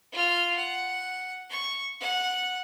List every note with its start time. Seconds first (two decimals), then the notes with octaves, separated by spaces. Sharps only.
0.12 F4 F6
0.56 F#5
1.50 C#6
2.01 F#5